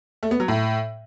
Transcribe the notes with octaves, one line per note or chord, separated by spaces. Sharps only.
A3
B3
F#3
A2